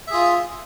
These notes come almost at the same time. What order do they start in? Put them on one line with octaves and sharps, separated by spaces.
E5 G#4 F4